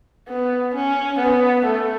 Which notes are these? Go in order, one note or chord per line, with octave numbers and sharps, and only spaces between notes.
B3
C#4
B3
A3